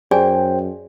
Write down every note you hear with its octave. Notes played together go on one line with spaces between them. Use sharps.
F#2 G#4 C5 D5 G5 G#5